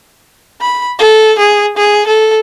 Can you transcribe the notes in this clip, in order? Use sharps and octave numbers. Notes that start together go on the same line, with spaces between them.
B5
A4
G#4
G#4
A4